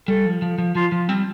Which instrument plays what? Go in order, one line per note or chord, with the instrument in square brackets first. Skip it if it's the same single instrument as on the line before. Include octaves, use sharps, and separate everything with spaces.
[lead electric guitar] G3 [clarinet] A4
[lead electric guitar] F3
F3
F3
[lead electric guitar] F3 [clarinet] F4
[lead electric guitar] F3
[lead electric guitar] G3 [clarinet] C4